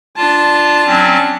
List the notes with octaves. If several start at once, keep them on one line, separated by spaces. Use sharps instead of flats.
D4 F4 A5
F#3 C4 C#4